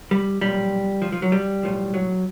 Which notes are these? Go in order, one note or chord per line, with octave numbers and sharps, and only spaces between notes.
G3
B1 A#2 F3 G3
F3
F3
F#3
G3
B1 A2 F3
F#3